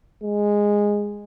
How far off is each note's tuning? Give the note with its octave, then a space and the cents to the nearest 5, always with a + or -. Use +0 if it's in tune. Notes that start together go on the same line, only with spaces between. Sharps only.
G#3 -10